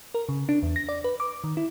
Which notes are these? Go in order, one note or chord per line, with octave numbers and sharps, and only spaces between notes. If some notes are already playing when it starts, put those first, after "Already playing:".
A#4
C#3
D4
E2
A#6
D5
B4
D6
D#3
E4